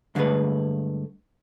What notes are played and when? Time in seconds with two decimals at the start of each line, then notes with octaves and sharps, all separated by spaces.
0.15 G2 D3 E3 G#3 A3 B4